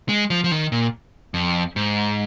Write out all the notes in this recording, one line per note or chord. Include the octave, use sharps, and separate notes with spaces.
G#3
F3
F3
D#3
A#2
F2
G#2